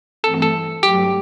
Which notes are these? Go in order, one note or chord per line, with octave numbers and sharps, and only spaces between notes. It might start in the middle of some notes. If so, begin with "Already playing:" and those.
G2 E3 A3 C4 A4
A4
G2 F#3 A3 G4